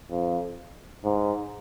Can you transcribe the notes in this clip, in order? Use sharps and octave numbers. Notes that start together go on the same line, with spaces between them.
F2
G#2